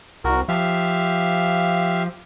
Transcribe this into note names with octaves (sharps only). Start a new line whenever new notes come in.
C2 F#4 A#4
F3 G4 E5 F5